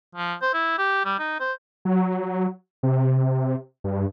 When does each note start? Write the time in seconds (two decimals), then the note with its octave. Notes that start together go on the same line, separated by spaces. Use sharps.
0.15 F3
0.42 C5
0.54 E4
0.78 G4
1.05 G3
1.19 D#4
1.40 C5
1.85 F#3
2.83 C3
3.84 G2